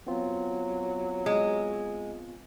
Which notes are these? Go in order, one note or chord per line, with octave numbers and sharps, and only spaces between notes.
F#3 B3 C4 F4
G#3